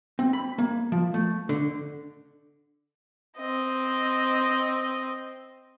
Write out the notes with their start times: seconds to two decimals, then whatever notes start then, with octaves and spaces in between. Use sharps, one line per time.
0.19 C4
0.33 B5
0.58 A#3
0.92 F3
1.14 A3
1.49 D3
3.38 C4 D#5